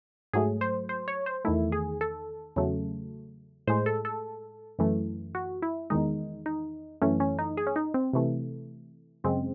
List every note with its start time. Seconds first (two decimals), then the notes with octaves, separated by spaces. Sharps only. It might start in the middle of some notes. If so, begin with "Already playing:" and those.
0.33 G#2 F#3 A3 G#4
0.61 C5
0.89 C5
1.08 C#5
1.26 C5
1.45 E2 D#3 A3 E4
1.72 G#4
2.01 A4
2.56 E2 C#3 F#3 A3
3.67 A2 G#3 C5
3.86 A4
4.05 A4
4.79 F#2 E3 A3
5.35 F#4
5.62 E4
5.90 E2 D#3 G#3 D#4
6.46 D#4
7.02 F#2 E3 A3 C#4
7.20 C#4
7.39 D#4
7.57 G#4
7.67 C#4
7.76 D#4
7.94 C4
8.13 C3 E3 A3
9.24 F#2 C#3 G#3 C4